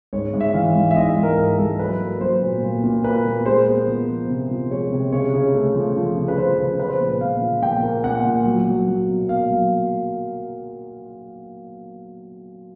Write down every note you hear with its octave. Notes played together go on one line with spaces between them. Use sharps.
G#2 C#5
G#2
E5
E3 F5
G#2
E5
G#2 D#5
E5
G#2
A#4
G#2 A#4
G#2 A4
F#3 B4
A#3
F#3 C5
A#2
A#2
A#2
A#3 B4
A#2
G#3 C5
B3
F3
B3
C3
F3
G#3 C#5
C3
C#3 C#5
C#3
A3
F3
F3
C#3
B4
F3 C5
C#3
F3 B4
C5
A#2 B4
A#2 F5
F3
A#2 G5
A#3
A#2 F#5
A#2
F#3
F#3
F#3
B2
A#3 F5
F#3